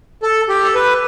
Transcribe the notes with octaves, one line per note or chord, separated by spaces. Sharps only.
A4
G4
A4
B4